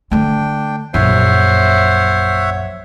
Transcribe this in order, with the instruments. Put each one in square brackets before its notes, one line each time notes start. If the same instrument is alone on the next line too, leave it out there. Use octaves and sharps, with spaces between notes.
[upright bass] D3 A3 [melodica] D4 G5
[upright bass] A#1 F#2 [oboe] C5 [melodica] C#5 E5 F#5